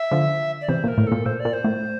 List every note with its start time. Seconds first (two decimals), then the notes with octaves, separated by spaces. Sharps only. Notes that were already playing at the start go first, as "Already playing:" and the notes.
Already playing: E5
0.11 D3 F3
0.62 D5
0.68 C3 E3 C5
0.84 A#2 A#4
0.98 A2
1.07 A#2 A4
1.26 A#2 C5
1.40 D5
1.45 A#2
1.53 C5
1.64 A2